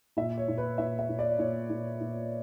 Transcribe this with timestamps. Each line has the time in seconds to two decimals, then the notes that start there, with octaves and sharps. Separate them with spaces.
0.17 A#2 E5
0.38 C#5
0.48 A#2
0.58 B4
0.78 A#2 E5
0.99 E5
1.09 A#2
1.19 D5
1.39 A#2 C#5
1.70 A#2
2.01 A#2